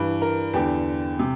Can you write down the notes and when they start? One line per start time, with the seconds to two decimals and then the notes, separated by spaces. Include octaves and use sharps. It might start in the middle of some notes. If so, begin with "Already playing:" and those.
Already playing: G2 E3
0.22 A#4
0.53 E2 D3 G4
1.19 C3